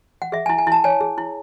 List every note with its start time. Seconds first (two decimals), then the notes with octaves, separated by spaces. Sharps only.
0.22 F#5
0.32 G#4 E5
0.46 E4 G#5
0.59 G#5
0.67 E4 A5
0.84 C#5 G#5
1.01 G#4
1.18 E4